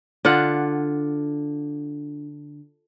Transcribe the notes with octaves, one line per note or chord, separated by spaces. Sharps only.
D3 D4 F4 F#5